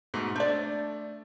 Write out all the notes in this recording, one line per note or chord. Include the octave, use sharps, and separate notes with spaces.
G#2 B2 A3
D4 C5 D5 G6
A3